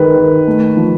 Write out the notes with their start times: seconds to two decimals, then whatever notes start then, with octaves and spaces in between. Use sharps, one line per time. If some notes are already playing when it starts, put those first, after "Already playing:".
Already playing: D#3 G#3 B4
0.17 D#3
0.47 A3
0.77 F3